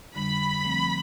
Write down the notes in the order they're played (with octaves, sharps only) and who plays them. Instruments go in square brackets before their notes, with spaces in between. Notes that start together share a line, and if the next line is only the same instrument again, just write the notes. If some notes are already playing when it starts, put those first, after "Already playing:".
[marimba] F2 D3 G3 D4 [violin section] B5
[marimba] F3 A3 C4